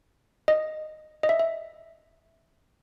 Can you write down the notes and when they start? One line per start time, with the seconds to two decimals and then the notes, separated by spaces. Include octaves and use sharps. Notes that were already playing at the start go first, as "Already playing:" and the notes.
0.48 D#5
1.23 D#5
1.29 E5
1.40 E5